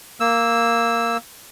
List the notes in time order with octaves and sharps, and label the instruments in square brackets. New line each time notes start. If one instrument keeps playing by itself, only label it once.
[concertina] A#3 E6